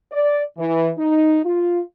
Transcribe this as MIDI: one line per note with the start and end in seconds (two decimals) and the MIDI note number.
0.12 0.43 74
0.59 0.90 52
0.99 1.39 63
1.45 1.82 65